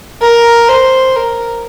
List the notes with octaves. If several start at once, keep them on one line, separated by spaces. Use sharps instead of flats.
A#4
C5
A#4